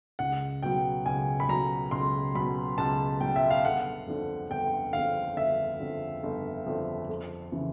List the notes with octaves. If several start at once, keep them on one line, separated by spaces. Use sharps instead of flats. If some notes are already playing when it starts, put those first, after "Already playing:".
C#2 F#5
B2 F#3 G5
C#2 G#5
B5
B2 F#3 A#5
C#2 C6
B2 F#3 B5
C#2 A5
B2 F#3 G5
E5
F5
G1 F#5
F2 D3
G1 G5
F2 D3 F5
G1 E5
F2 D3
G1
F2 D3
F2
C#3 E3